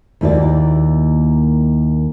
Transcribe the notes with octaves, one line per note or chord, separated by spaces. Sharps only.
D#2 A#3 E4 F#4 D5